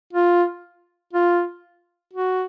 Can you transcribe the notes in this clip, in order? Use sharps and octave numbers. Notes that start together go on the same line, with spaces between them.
F4
F4
F#4